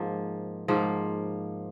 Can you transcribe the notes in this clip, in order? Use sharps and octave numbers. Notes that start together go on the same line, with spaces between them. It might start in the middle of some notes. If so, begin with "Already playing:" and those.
Already playing: G#2 F3 A#3
G#2 F3 A#3